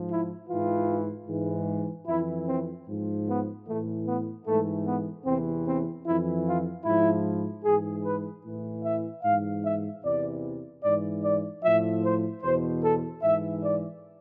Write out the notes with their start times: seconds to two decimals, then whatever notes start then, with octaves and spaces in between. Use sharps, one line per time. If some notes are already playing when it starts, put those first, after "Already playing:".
Already playing: G#2 F3
0.08 E4
0.48 G#2 E3 F4
1.27 G#2 E3
2.06 F2 E3 E4
2.47 C4
2.86 G#2 F3
3.27 B3
3.66 A2 E3 A3
4.06 B3
4.46 G#2 E3 A3
4.85 B3
5.25 E2 C3 E3 C4
5.66 C4
6.05 F2 E3 E4
6.45 F4
6.85 G#2 F3 E4
7.65 G#2 E3 G#4
8.04 B4
8.44 A2 E3
8.84 E5
9.24 G#2 E3 F5
9.63 E5
10.03 E2 C3 E3 D5
10.82 G#2 E3 D5
11.22 D5
11.63 A2 F3 E5
12.03 C5
12.42 E2 B2 C5
12.83 A4
13.22 G#2 E3 E5
13.62 D5